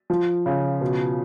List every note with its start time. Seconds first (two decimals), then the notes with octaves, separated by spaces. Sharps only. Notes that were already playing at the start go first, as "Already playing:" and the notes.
0.10 F3
0.46 C#3
0.81 B2